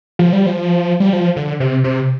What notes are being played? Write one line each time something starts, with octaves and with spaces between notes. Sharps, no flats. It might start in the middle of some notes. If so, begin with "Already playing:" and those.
F3
G3
F3
G3
F3
D3
C3
C3